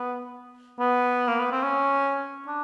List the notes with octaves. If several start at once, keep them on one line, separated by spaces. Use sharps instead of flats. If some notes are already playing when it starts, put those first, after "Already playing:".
Already playing: B3
B3
A#3
B3
C4
C#4
D4